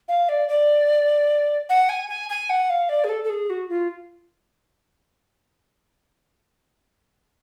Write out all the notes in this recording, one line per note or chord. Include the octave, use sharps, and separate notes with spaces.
F5
D5
D5
F#5
G#5
G#5
G#5
F#5
F5
D5
G#4
A4
A4
G#4
F#4
F4